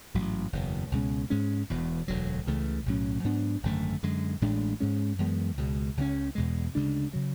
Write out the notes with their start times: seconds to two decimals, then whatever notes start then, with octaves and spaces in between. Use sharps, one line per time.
0.14 A1 G#2 F#3
0.53 F#1 E2 B2
0.92 C#2 B2 G#3 C#4
1.30 G#2 G#3 C#4
1.70 E1 E2 B2
2.08 E1 D2 D3 F#3
2.47 C#2 C#3 E3 A3
2.86 B1 A2 F#3 C#4
3.24 G#2 F#3 B3 D4
3.63 G#1 F#2 D3 A3
4.03 F#2 D3 G#3
4.42 A1 A2 G#3 D4
4.80 G#2 G#3 C#4
5.19 F#2 E3 G#3 B3
5.57 C#2 B2 G#3
5.97 C#2 C#3 G#3 C#4
6.35 E2 B2 G#3
6.75 D2 C#3 G#3 D4
7.13 C#3 F#3